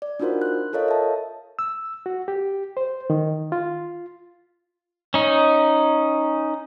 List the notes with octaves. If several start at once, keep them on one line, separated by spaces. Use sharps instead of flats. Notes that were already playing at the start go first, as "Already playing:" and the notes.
D5
D4 D#4 F4 F#4 A#4 C5
F#6
F4 A4 A#4 C#5 D#5 F5
E5 A5
E6
F#4
G4
C5
D#3
F4
C#4 D#4